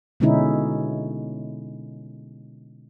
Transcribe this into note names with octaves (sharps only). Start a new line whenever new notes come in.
B2 D3 G#3 C#4 D#4 E4